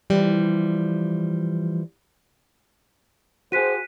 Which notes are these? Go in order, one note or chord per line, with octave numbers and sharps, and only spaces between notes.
E3 F3 G3
F#4 G#4 C5 F#6 B6 D#7